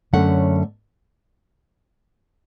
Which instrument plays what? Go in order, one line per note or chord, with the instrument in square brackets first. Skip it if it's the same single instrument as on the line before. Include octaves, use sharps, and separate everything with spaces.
[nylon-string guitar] F#2 D3 A3 C#4 F#5